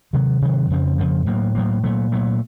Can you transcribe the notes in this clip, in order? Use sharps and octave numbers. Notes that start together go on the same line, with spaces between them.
C3 D#3 F#3
C3 D#3 F#3
F2 C#3 F3
F2 C#3 F3
A2 F#3 A#3
A2 F#3 A#3
A#2 F#3 A3
A#2 F#3 A3